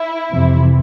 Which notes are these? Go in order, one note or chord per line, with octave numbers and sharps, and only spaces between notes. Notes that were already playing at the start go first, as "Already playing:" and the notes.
Already playing: E4
F2 C3 E3